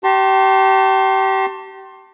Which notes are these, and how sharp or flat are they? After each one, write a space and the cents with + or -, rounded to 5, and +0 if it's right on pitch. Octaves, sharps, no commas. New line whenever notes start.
G4 -30 A5 +25 C6 +25